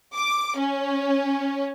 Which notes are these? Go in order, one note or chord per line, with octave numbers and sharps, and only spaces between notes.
D6
C#4